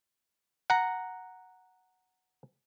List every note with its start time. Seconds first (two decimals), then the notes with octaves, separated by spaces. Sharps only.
0.70 F#5 A#5